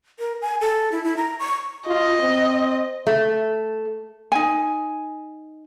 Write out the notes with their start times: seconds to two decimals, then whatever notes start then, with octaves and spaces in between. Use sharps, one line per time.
0.19 A#4
0.42 G#5
0.61 A4
0.92 E4
1.04 E4
1.17 A#5
1.39 C#6
1.87 F4 D#5
2.19 C4
3.07 A3
4.32 D#4 G#5